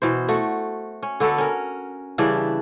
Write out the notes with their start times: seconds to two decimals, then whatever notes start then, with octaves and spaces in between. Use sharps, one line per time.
0.02 B2 E3 C5
0.28 A3 F#4
1.03 C#4
1.20 D3 B3 F#4 A4
1.38 C#4 A#4
2.18 C#3 E3 G3 D4